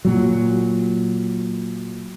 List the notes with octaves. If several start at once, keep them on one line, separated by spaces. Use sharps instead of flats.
A#2 F#3